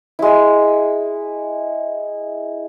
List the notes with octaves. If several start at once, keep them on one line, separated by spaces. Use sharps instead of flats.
G#3 E4